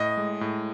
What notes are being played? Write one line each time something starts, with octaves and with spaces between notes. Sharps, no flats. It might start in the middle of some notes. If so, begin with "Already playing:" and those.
Already playing: A2 D#5
G#3
A2